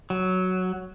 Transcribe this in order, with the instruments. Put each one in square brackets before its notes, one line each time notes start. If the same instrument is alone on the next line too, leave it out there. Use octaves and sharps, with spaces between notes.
[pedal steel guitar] F#3